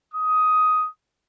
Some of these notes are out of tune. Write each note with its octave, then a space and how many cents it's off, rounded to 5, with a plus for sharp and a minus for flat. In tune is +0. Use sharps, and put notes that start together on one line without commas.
D#6 +10